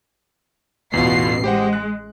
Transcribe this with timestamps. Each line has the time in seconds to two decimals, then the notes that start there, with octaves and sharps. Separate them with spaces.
0.93 A1 E2 B2 F4 C7
1.44 G#3 G4 C5 F#5
1.73 F#6